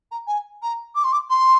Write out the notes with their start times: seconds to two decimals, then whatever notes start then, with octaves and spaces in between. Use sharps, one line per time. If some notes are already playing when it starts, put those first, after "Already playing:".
0.11 A#5
0.27 G#5
0.62 A#5
0.95 D6
1.04 C6
1.12 D6
1.29 C6